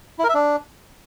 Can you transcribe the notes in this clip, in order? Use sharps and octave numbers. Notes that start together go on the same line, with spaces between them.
E4
A#4
E5
D4